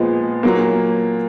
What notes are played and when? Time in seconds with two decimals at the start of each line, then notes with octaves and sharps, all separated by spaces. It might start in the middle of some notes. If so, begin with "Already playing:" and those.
Already playing: A#2 F3 G#3 B3
0.43 A#2 F#3 A#3